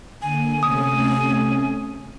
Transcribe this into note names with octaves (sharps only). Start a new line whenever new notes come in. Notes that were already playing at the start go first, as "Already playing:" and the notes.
D3 A#3 G#5
C3 A3 C#4 D#6